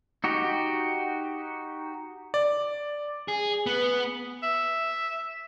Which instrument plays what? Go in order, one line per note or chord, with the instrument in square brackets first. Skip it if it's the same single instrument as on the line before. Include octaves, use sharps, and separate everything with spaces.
[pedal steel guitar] D#4 F#4 G4
[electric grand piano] D5
[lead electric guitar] G#4
B3
[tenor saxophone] E5